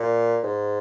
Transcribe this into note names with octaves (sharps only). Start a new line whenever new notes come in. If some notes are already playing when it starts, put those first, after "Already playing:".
Already playing: A#2
G#2